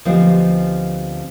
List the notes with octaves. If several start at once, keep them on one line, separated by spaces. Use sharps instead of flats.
D2 F3 B3 C4 G4 D#5